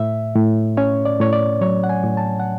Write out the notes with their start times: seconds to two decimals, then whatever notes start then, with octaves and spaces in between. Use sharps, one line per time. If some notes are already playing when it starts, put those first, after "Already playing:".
Already playing: A2 E5
0.36 A2
0.77 C#4 C#5
1.05 D5
1.20 A2 C#5
1.33 D5
1.61 F#3 C#5
1.84 F#5
1.89 G#5
2.03 A2
2.17 A5
2.40 F#5